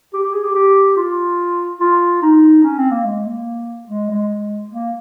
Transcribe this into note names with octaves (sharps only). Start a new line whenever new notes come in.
G4
G4
G#4
G4
G4
F4
F4
D#4
C#4
C4
A#3
G#3
A#3
G#3
G#3
A#3